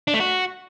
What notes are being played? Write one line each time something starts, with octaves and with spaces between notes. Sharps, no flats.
D4
A3
F#4